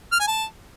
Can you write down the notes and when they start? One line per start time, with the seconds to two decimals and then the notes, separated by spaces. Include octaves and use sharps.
0.12 F6
0.20 G#5
0.28 A5